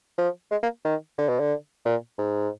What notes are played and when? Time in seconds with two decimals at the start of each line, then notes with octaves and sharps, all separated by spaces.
0.18 F3
0.51 G#3
0.63 A#3
0.85 D#3
1.18 D3
1.29 B2
1.40 D3
1.85 A#2
2.19 G#2